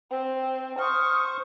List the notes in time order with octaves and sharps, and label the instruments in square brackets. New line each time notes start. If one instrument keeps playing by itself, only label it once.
[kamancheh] C4
[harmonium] C5 [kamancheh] C#6 [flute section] D#6 F6